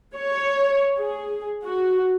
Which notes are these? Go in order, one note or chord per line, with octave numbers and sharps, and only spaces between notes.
C#5
G#4
F#4